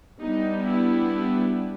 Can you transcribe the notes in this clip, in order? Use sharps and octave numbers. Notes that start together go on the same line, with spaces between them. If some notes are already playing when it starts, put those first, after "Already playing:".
G3 B3 D4 D#4
E4